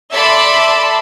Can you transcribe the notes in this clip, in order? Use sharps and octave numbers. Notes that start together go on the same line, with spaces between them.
A4 D5 E5 A5 B5 C6